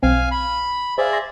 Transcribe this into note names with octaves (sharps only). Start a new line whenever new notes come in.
B1 C4 F5 G#5
B5
G#4 C5 D5 E5 F5
C6 A#6